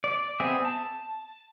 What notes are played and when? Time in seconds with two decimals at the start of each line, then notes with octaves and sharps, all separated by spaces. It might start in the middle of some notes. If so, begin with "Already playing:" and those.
0.04 D5
0.40 B3 C4 G#4 E5
0.65 A5